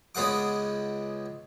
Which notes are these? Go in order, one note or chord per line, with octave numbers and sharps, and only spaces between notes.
C#2 B3 G#4 F#5 D6